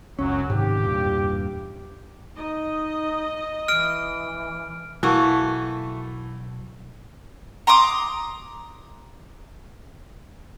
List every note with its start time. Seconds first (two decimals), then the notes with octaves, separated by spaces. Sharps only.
0.19 F#1 C#2 F#2 F#3 C#4
0.50 G#2 C3 D#3 G4
0.82 E2 G2 A#2
2.35 D#4 D#5
3.68 E3 F6 D7
5.03 B1 E3 A3 A#3 F#4 A5
7.67 A#5 C6 D6 D#6